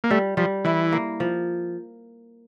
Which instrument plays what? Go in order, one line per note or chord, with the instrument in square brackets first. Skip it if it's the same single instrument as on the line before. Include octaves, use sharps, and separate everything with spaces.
[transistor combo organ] A#3
[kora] G3 [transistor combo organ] A3
[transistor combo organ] F3 [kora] G3
[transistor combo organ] E3 [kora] E4
[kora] A#3
F3